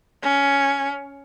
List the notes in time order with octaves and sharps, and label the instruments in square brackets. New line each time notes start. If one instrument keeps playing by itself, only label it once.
[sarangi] C#4